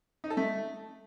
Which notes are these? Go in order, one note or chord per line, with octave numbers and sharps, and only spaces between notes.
D#4
A4
A3